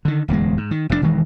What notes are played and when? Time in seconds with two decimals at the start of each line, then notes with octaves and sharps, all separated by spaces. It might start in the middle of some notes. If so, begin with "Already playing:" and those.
0.05 D3 D#3
0.28 D1 E2 E3 G#3
0.57 G#2
0.71 D#3
0.89 F1 F2 B2 D4
1.02 E1 D#3 E3 G#3